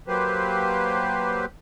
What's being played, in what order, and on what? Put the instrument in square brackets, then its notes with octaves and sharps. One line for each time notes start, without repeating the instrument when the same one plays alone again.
[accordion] F#3 A#3 G4 B4 C5